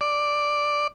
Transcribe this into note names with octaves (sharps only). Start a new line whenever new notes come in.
D5